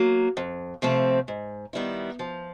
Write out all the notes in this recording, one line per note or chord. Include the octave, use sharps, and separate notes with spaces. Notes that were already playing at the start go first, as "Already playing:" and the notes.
Already playing: F#3 A#3
F2
C3 F3 A3 C4
G#2
D#3 G3 B3 E4
F3